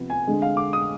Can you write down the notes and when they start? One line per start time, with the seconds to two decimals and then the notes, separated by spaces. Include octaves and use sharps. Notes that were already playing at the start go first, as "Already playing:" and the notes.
Already playing: C3 F3 B3
0.10 G#5
0.26 D3 G#3 C4
0.42 F5
0.57 D6
0.73 D#6